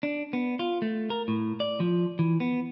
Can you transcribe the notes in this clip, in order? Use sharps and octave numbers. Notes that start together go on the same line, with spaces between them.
D4
B3
F4
A3
A#4
A2
D5
F3
E3
B3